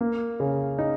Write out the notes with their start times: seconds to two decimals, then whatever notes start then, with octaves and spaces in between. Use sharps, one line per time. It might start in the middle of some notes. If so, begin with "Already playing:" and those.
0.01 A#3
0.40 C#3
0.79 D#4